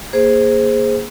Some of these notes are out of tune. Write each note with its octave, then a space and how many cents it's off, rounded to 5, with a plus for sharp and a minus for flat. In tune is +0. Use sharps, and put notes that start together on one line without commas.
A#3 +0 G#4 +0 C5 +0